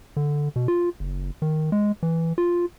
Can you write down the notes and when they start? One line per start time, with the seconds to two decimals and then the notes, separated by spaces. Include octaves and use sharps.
0.17 D3
0.56 B2
0.68 F4
1.00 F#1
1.42 D#3
1.72 G#3
2.03 E3
2.38 F4